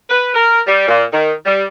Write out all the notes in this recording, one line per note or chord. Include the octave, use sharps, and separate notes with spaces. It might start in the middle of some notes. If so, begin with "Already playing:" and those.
B4
A#4
G3
A#2
D#3
G3